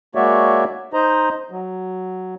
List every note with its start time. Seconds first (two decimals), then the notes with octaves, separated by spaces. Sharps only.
0.15 G#3 A#3 F#4 C#5 D5 E5
0.93 D#4 C5 D#5 A#5
1.51 F#3